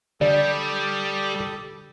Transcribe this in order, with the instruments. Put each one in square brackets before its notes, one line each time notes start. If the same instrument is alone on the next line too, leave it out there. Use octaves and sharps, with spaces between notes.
[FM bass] D3 [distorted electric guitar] G3 [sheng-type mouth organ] G4 A4 D#6 [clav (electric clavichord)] D5